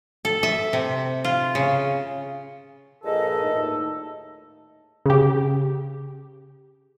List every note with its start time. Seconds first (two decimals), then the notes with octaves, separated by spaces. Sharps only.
0.25 A4
0.43 E5
0.73 C3
1.24 F4
1.55 C#3
3.04 G2 A#2 F3 G#4 A4 D#5
3.41 D#2 A2 D#4
5.06 C#3 G4